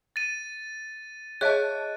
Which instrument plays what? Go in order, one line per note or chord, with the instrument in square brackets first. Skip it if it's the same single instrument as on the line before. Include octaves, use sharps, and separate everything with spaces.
[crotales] A6 D#7
[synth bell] G#4 D#5 A5 [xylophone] C#5 E5 [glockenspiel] F#6